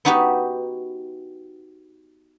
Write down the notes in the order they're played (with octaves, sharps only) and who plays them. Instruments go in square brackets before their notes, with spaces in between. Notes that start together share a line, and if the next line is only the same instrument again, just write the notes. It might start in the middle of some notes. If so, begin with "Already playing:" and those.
[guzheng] B3 D#4 F#4 G4 B4